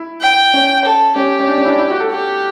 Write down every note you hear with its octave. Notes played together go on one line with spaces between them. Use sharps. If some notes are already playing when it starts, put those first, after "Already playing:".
Already playing: E4
G5
C#4
A4
C#4 G4
C#4
D4
C#4
E4
D4
E4
F#4
A4
G4